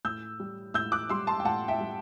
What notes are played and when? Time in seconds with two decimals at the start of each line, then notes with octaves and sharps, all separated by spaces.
0.05 A2 E6 G6
0.40 G3
0.74 A2 E6 G6
0.92 D6 F#6
1.09 G3 C6 E6
1.27 A5 C6
1.40 G5
1.45 A2 F#5 A5
1.68 E5 G5
1.80 G3